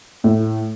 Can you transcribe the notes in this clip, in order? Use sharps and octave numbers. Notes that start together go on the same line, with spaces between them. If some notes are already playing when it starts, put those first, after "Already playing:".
A2